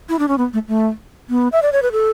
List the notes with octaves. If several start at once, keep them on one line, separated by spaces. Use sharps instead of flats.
E4
D4
C#4
B3
A3
A3
B3
E5
D5
C#5
B4
A4